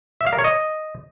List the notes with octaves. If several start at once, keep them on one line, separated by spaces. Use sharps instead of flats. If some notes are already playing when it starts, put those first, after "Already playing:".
E5
F5
A#4
C#5
D#5